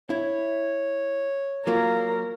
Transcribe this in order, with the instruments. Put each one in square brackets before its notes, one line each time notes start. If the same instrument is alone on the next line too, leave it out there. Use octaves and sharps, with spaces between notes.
[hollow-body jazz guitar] E4 [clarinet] C#5
[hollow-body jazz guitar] F#3 A#3 F4 [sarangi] A#4